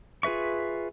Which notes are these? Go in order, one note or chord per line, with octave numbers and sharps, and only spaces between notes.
F4 G#4 B4 E5 C#6